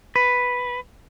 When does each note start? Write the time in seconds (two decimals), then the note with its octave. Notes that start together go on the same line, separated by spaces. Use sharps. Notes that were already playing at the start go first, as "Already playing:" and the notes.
0.16 B4